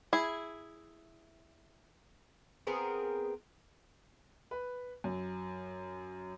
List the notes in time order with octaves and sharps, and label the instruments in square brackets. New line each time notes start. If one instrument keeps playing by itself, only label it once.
[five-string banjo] E4 G#4
[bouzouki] B3 C4 G#4 A#4
[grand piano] B4
F#2